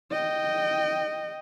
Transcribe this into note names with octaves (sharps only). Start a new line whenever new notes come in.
D#5 G5